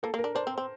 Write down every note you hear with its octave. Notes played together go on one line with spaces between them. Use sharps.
A#3 A4
A#3
A#4
D4
D4 C5
C4
C4